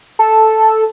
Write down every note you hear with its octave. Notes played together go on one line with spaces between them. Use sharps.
A4